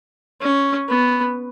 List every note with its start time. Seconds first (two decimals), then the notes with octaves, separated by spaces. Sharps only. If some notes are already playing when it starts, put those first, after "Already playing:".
0.41 C#4
0.88 B3